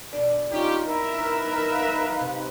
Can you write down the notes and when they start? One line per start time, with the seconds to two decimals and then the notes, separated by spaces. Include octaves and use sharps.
0.13 B2 D4
0.50 C#4 D#4 F4 G4
0.86 E4 A#4 E5
1.16 D#4 B4
1.71 F5
2.20 C3